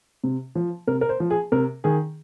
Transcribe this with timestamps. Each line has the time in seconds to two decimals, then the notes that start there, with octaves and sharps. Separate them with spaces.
0.24 C3
0.55 F3
0.87 C3 A#4
1.01 A#4
1.09 C5
1.20 F3
1.30 G#4
1.52 C3 A#4
1.84 D#3 G#4